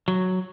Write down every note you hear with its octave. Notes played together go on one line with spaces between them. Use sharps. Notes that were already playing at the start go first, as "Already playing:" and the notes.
F#3